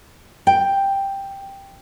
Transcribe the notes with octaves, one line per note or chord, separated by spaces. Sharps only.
G5